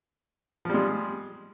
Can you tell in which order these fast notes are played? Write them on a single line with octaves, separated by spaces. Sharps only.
F3 G3 G#3